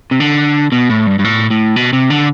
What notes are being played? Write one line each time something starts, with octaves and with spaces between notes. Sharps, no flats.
C3
D3
B2
A2
G2
G2
A2
A2
B2
C3
D3